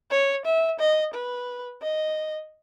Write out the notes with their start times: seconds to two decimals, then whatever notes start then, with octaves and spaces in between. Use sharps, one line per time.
0.11 C#5
0.45 E5
0.80 D#5
1.14 B4
1.82 D#5